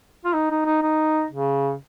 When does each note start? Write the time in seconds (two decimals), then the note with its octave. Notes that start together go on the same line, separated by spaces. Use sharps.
0.25 F4
0.34 D#4
0.51 D#4
0.66 D#4
0.82 D#4
1.31 C#3